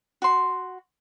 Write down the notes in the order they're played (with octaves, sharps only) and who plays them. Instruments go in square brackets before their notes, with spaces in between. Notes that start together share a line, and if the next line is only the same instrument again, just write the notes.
[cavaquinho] F#4 C6